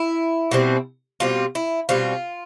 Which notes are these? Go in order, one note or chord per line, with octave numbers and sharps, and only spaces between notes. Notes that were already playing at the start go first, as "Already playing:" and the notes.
Already playing: E4
B2 G3 C4
B2 G3 C4 F4
E4
B2 G3 C4 F4